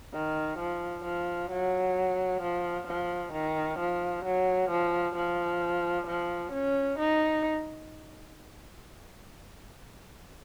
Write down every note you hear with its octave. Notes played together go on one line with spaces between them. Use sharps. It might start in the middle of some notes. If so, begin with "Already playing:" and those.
D#3
F3
F3
F#3
F3
F3
D#3
F3
F#3
F3
F3
F3
C#4
D#4